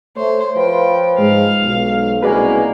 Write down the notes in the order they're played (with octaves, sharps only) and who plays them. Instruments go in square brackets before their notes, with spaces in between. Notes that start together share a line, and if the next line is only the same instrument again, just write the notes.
[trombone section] A3 [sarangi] C5 [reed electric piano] C#5
[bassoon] F3 [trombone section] F4 B4 [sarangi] G5
[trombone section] G#2 [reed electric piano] G#3 [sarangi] F5
[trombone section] B1
[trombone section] C2 C#3 F#4 [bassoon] G#3 [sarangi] A#3 [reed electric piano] B4 D5 G#5